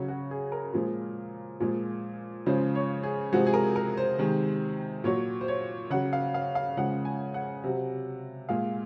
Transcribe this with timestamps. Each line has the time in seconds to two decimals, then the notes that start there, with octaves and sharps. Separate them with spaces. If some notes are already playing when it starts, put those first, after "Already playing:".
Already playing: C#3 F#3 C#5
0.08 F#4
0.31 G#4
0.52 A#4
0.73 A#2 F3 G#3
1.60 A#2 F3 G#3
2.46 C#3 F3 G#3 C5
2.75 C#5
3.03 G#4
3.33 C3 F3 G#3 F#4
3.47 G#4
3.54 A#4
3.76 A#4
3.97 C5
4.18 C3 D#3 G#3
5.04 A#2 F#3 C#5
5.41 C5
5.48 C#5
5.90 C#3 F#3 F#5
6.13 F5
6.34 F5
6.55 F5
6.77 C#3 F3 G#3 F#5
7.05 G#5
7.34 F#5
7.64 C3 F#3
8.49 A#2 G#3 F5